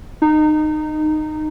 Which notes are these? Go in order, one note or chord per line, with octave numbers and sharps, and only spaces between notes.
D#4